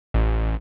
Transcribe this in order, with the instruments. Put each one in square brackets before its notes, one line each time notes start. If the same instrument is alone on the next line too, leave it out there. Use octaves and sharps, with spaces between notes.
[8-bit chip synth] A1